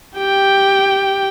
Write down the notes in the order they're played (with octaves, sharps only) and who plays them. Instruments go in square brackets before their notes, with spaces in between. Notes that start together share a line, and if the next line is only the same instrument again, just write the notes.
[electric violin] G4 G5